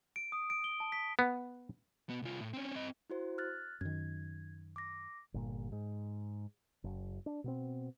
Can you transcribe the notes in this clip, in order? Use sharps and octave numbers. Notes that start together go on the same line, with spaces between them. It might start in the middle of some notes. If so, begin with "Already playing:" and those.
D7
D#6
D7
G7
A5
B6
B3
B3 F#4
C2 F4
A2
C4 C#4
C4 D#5
E4 F#4 C5
F6 F#6 A6
F#2 D#3 G#6
D6 A#6
G1 A#2
G#2
F#1
D4
B2 B3 C4